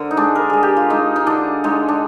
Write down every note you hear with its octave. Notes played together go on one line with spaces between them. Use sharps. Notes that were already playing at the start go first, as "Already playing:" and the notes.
Already playing: D3 A#4 C5
D#4
G#3 D4
A#4
G#3 G#4
G4
F4
G#3 D#4
D#4
D3 D4
G#3 D#4
D4